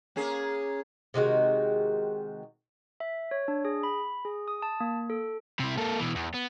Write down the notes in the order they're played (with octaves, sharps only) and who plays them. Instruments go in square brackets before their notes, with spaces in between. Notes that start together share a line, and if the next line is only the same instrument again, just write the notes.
[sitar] A#3 C#4 G#4
[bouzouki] C3 D#3 G#3 F#4
[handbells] E5
C#5
D4
G#4
B5
G#4
D#6
A5
A#3
A4
[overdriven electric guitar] C3 E4
A#3 A4
B2 E3
E2
B3